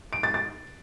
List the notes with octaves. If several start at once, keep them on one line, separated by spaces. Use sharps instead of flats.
D7
A6
A6